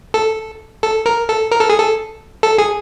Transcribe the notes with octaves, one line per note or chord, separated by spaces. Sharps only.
A4
A4
A#4
A4
A#4
A4
G#4
A4
A4
G#4